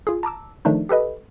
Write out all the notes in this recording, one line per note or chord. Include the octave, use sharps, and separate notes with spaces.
F4 G#4
A5 A#5 D6 E6
D#3 F3 A3 D4 D#4
G4 A4 B4 D#5